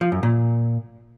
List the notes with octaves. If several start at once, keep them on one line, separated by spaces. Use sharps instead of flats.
F3
F#2
A#2